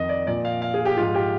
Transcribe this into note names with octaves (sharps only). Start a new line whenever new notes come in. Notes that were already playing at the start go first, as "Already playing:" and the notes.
Already playing: F2 D#3 D#5
D5
A#2 F3 D5
F5
F5
G#4
G4
G#2 F3 F4
G4